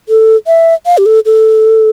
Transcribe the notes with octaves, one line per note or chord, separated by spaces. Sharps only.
A4
E5
F5
G4
A4
A4